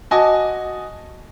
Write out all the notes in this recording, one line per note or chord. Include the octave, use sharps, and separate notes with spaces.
F#4 D#5 G#5 A5 D6